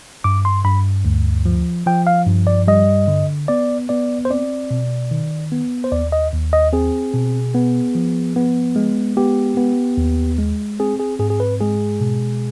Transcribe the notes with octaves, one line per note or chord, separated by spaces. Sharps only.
G2 D6
C6
G2 B5
D2
F3
F3 G5
F5
G2
D5
G3 D#5
D3
B3 D5
B3 D5
C5
C4 D5
B2
D#3
B3
C5
D#2 D5
D#5
D#2
D#5
C4 G#4
B2
B3
F3
B3
G#3
B3 G4
B3
D#2
G#3
C4 G#4
G#4
G#2 G#4
G#4
B4
G#3 G#4
B2